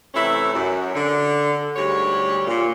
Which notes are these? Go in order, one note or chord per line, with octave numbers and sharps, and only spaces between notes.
C3 E3 A3 C#4 E4
F#2
D3
D2 G#2 G3 C#5
A#2